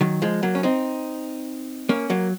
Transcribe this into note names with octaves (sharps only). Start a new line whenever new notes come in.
D#3 F#3
F3 G#3
F#3 A#3
C#4
C4 D#4
A#3 C#4
F#3 A#3